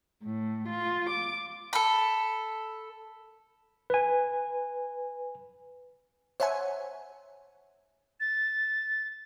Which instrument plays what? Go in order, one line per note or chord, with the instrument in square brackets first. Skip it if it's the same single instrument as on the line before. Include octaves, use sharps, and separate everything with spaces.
[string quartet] A2
F4
D6
[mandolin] A4 B5
[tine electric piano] B4 G#5
[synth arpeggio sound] C5 C#5 E5 F#5 G#5
[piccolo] A6